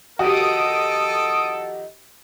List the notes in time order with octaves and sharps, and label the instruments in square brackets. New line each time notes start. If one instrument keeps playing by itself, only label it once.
[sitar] F2 D#3 [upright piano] F#4 G4 [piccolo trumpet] A4 [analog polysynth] D#6 D7